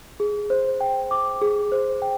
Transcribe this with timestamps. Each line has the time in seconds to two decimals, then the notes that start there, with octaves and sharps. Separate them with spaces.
0.20 G#4
0.50 C5
0.81 G5
1.11 D6
1.42 G#4
1.72 C5
2.02 G5